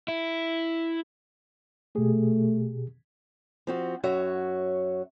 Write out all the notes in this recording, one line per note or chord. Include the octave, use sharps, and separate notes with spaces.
E4
B2 A3 G4 G#4
F3 C4 F#4
F#2 F#4 C#5 E5